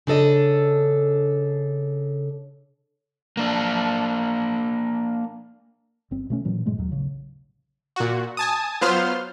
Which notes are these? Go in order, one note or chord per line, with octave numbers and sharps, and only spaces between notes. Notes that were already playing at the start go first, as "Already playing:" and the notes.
C#3 D4 A4 D#5
A#3 D4
F#1 C4
B2 A3 C#4
A#2 E3 F#3
G2 A#2 G#3 A3
D#2 F#3
A1 C#3
A#2 F#4
G#5 A5 D#6
F#3 B3 F4 C5 C6 F6